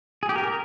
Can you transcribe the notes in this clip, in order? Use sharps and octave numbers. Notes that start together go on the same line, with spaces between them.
G#4
G4
A#4